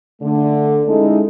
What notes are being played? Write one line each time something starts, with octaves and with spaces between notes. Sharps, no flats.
D3 A3
G#3 C#4 D#4 E4 A4